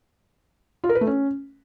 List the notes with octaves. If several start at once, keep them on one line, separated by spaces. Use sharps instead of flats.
F4
A#4
B4
A3
C#4